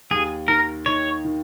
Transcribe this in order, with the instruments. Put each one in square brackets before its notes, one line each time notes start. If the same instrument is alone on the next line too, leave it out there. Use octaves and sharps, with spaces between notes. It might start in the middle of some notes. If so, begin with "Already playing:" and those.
[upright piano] D#2 [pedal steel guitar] G#4
[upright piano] D#3 [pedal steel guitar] A#4
[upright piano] D#4 [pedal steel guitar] C#5
[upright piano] D#3